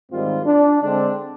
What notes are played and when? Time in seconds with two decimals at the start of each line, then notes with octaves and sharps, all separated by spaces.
0.11 G#2 D#3 G3 C4 F4
0.46 D4
0.82 D3 G#3 C4 D4